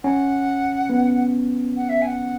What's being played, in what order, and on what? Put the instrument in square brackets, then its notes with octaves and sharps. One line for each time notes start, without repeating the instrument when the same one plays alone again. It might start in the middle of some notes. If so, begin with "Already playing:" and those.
[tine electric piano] C#4 [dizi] F#5
[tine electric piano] B3
[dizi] F#5
E5
G#5
F#5